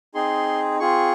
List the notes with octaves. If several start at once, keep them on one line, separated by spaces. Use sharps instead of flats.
C4 D#4 G#4 C6
C4 F4 G#4 C#6